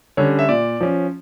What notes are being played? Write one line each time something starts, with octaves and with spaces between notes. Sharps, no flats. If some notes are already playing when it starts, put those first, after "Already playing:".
D3 G3 C#4 C#5
E5
A#2 D5
F3 C#4